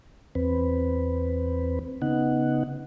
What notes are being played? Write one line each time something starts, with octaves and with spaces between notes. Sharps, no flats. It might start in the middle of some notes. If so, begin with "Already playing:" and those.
E2 C4 B4
C#3 B3 D#4 F#5